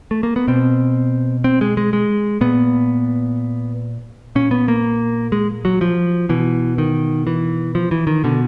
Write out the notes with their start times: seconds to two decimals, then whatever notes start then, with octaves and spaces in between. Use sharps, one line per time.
0.11 A3
0.23 A#3
0.36 B3
0.48 B2 C4
1.44 C4
1.61 G#3
1.77 G#3
1.93 G#3
2.41 A#2 B3
4.35 A#2 C#4
4.51 B3
4.68 A#3
5.32 G#3
5.65 F#3
5.81 F3
6.29 B2 E3
6.78 D#3
7.27 E3
7.75 F3
7.91 E3
8.07 D#3
8.24 B2 D3